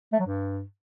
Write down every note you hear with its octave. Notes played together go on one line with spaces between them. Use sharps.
A3
F#3
G2